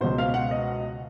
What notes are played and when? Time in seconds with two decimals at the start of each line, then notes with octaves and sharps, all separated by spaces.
0.01 C#2 B2 C5
0.18 F5
0.34 F#5
0.51 D#5